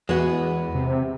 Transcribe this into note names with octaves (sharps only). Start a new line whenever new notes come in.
E2 G#3 B3 F#4
C3